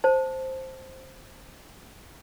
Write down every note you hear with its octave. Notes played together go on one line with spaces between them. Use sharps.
C5 A5